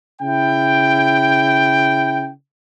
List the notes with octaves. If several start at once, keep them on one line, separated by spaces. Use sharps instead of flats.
C#3 E4 G5